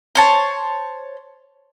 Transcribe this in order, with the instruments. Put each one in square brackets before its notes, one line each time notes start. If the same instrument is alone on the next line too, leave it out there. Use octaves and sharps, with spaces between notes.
[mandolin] C5 C#5 A5